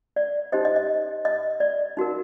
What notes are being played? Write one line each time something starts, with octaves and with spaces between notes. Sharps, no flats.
D5
D#4 G4 C5 D#5
D#5
D#5
D#5
D5
D#4 F#4 A#4